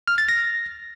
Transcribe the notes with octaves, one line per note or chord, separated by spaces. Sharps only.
F6
A6
A#6